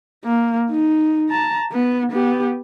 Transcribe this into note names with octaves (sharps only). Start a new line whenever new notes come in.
A#3
D#4
A5 A#5
B3
B3 G4